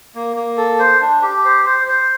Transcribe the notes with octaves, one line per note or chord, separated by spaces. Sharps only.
A#3
A#3
A4
C5
D4
G4
C5
C5
C5